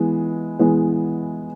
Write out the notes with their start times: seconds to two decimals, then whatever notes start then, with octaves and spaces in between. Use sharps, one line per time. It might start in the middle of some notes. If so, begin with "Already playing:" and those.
Already playing: E3 G#3 B3
0.59 E3 G#3 B3